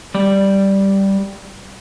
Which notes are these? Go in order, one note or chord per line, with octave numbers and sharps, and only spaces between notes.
G3 D5